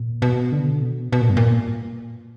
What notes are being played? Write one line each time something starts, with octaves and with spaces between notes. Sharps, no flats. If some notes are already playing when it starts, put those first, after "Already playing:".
Already playing: A#2
B2
D3
B2
B2
A#2
G2
A#2